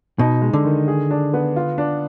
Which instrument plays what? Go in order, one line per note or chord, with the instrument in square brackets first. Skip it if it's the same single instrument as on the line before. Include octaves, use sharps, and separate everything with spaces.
[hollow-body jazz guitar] B2 [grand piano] D#4
[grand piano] G#3
[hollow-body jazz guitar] D3
[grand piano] D#3
G#4
D4
B3
F4
D4